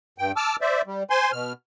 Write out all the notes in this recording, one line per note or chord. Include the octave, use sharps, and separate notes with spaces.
G2 G5
A5 D6 E6 F6
C5 D5 E5
G3
C5 G#5 C6
B2 F6